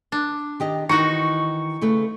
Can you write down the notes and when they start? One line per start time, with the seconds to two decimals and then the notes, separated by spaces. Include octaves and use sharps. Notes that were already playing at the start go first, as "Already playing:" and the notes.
0.12 D4
0.60 D#3 G4 D#5
0.89 D#3 E3 D#4 F#4 C#6
1.81 C#3 A3 B4